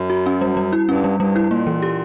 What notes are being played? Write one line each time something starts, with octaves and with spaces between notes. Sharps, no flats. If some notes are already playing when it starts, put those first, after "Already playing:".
Already playing: F#2
F#4
C#4
G3
G3
E4
G2 C#4
G3
G2 G3
E4
A#2 A#3
E3
G4